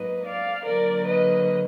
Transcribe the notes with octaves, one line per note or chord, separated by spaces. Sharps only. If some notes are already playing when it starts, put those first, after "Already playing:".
Already playing: G#2 F#3 A#3 D#4 B4 D#5
D5 F5
D3 F#3 A#3 A#4 D5
B4 D#5